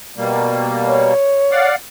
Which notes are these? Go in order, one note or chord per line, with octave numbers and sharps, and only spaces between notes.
B2 G3 A#3
C#5
D5 F5 F#5